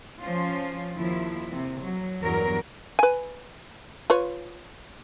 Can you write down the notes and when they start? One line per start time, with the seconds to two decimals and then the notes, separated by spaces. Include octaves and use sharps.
0.22 F3 C#4 F4
0.97 D#2 F3 E4
1.52 C3
1.83 F#3
2.22 E2 G2 F#3 A#4
2.99 B4 G#5
4.10 F4 B4 C#5